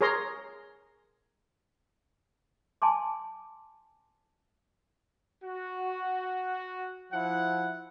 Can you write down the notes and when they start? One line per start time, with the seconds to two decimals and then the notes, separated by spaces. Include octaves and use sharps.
0.01 G#4 A#4 C#5 A#5 C6
2.82 G#5 A5 C6 D6
5.44 F#4
7.13 F3 E4 F#5